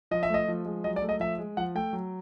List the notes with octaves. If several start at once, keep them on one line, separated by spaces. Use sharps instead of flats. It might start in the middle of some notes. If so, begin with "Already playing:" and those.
F3 D#5
E5
A3 D#5
F3
G#3
F#3 D#5
D5
A3
D#5
F3 E5
G#3
F3 F#5
A3 G5
F#3